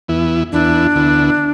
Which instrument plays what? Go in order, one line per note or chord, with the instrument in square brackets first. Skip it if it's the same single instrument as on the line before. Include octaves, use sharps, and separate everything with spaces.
[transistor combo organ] E2 E3 B3 E4
[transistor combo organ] E2 E3 B3 E4 [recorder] D4
[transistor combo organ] D2 D3 B3 E4